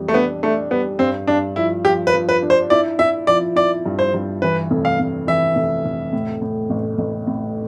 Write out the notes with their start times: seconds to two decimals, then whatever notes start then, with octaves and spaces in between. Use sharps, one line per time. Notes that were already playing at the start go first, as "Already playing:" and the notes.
Already playing: F2 E3 G3
0.08 A3
0.13 B3 D4
0.43 A3 D4
0.71 G3 B3
0.99 G2 C4
1.28 G2 D4
1.56 F3 E4
1.85 F3 G4
2.07 B4
2.13 F3
2.29 B4
2.42 D4
2.50 C5
2.70 E4 D5
2.99 E4 E5
3.27 F3 D5
3.56 E4 D5
3.86 G2
3.99 C5
4.14 G2
4.42 E3 B4
4.71 F1
4.85 F5
4.99 F1
5.27 E3 E5
5.56 F1
5.85 F1
6.13 A2
6.42 A2
6.70 A1
6.98 A1
7.27 A2